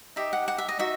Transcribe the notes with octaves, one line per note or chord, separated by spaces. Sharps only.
D#4 G4 D#5 E5
F#5
F#5
E5
D#5
D#4 F#4 E5